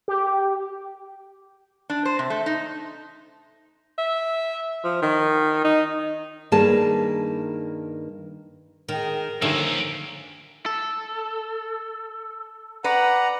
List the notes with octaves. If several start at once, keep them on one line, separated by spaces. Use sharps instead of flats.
G4
D4
C5
C3
A3
D#4
E5
F3
D#3
D#4
G2 D#3 A#3 G#4 B4 A5
D#3 G#4 A#4
G2 D3 D#3 F3 A#3 E5 G#5
A4
B4 D5 F#5 A#5